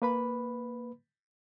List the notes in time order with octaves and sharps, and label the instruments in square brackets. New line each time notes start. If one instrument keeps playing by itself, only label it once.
[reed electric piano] A#3 B4 B5